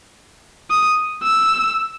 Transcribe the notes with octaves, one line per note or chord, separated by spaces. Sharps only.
D#6
E6